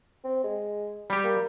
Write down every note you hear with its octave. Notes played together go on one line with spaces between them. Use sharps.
C4
G#3
G3 G4
A#3